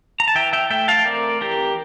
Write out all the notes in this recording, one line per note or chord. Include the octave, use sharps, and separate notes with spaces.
A#5
A5
E3 E5 G5
E5 G5
A3 E5 G5
F5 A5
C4 A#4 D5
E3 G4 A#4